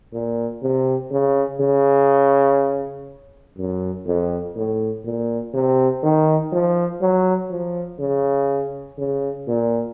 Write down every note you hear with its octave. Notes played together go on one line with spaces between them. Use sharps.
A#2
C3
C#3
C#3
F#2
F2
A2
A#2
C3
D#3
F3
F#3
F3
C#3
C#3
A#2